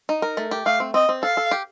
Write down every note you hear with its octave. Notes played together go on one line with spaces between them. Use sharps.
D#4
A#4
A3
G4
A3 F5
C4
C4 D#5
C4
A4 F5
A4
G4